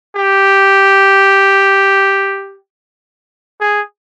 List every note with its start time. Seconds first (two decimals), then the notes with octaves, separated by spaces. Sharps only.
0.15 G4
3.60 G#4